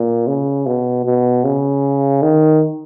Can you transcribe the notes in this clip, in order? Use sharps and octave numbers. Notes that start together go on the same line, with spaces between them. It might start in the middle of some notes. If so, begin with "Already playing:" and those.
Already playing: A#2
C#3
B2
B2
C#3
D#3